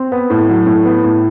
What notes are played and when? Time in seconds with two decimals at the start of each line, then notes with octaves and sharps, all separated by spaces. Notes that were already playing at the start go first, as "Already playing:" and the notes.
Already playing: C4
0.12 B3
0.30 A2
0.49 F#3
0.66 A2
0.85 B3
1.04 A2